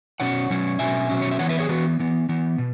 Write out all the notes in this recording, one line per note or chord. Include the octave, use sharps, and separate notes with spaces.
B2 F#3 C#4 C#5 F#5
B2 F#3 C#4
B2 F#3 C#4 E5 G#5
B2 F#3 C#4
C#5
E5
E3 B3 C#5 F#5
B4 E5
G#4 C#5
E3 B3 F#4 B4
E3 B3
E3 B3
B2